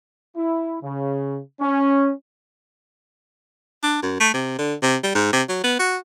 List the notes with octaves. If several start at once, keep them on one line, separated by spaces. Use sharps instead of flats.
E4
C#3
C#4
D4
F#2
A3
C3
D3
C3
G3
G#2
C3
F#3
B3
F#4